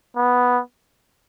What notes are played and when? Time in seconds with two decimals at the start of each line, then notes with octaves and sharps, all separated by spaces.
0.16 B3